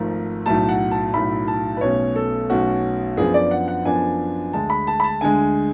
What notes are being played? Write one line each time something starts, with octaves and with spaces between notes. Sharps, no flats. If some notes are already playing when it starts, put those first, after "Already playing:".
Already playing: G#1 G#2 F3 A3
B1 A2 F#3 A3 A5
F#5
A5
B1 A2 F#3 A3 B5
A5
B4
B1 B2 A3 C#4 C#5
A4
B1 B2 A3 C#4 F#4
F#2 F3 B3 D4 G#4
D5
F#5
F#5
F#2 F3 B3 D4 G#5
D2 D3 G#3 A5
B5
A5
B5
A5
D2 D3 G#3 G#5